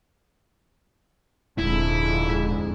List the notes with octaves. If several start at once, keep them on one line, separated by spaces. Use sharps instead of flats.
D#1 F2 G#2 D3 G#3 E4